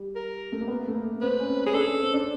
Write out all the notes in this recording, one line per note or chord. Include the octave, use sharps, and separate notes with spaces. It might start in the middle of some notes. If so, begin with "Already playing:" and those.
Already playing: G3
A#4
A3
A#3
B3
A3
A#3
C4 B4
C#4
C4
C#4 G#4
D4 A4
C#4
C4
D4